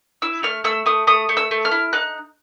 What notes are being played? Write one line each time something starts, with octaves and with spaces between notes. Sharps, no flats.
E4 E6
A3 F6
A3 E6
A3 D#6
A3 D#6
A3
E6
A3
F6
E4
D#4 F#6